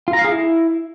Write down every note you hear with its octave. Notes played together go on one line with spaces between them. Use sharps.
F4
A#5
F5
G#4
E4